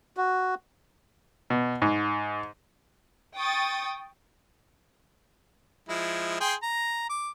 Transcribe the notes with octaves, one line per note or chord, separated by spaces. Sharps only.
F#4
B2
G#2
G5 C#6 D#6 A6
F3 G#3 E4
G#4 G5 C6
A#5
D6